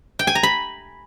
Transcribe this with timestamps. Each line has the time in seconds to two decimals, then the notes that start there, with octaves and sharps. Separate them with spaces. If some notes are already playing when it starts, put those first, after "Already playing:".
0.19 G5
0.27 G#5
0.35 A#5
0.43 B5